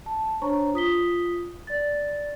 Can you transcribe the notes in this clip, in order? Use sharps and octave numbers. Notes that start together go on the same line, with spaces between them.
A5
D4 C5 C#5 A#5 C#6
F4 D#6 B6 G7
D5 A6